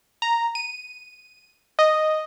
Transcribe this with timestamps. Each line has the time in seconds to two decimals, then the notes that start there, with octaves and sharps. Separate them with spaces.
0.22 A#5
0.55 D#7
1.79 D#5